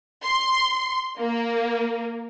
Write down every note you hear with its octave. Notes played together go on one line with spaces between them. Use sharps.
C6
A#3